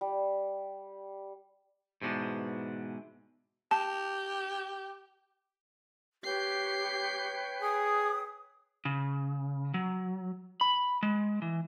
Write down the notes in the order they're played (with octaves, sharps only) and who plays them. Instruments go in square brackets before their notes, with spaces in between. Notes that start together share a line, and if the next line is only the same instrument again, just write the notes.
[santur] G3
[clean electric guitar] G#2 B2 E3 D4
[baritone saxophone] G4 [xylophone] A5
[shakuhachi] G4 [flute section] B4 C#5 G5 [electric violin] G6 C7
[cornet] G#4 [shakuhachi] D#6
[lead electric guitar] C#3
F#3
B5
G#3
E3